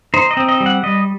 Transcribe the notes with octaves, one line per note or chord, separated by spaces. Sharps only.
D#4 C5
D#5
C4
D#5
G3
F#5
G3 D#5